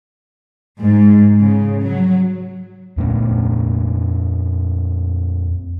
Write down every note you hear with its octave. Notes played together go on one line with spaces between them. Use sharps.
G#2
C#3
F#3
F2 A#2 A3 C#4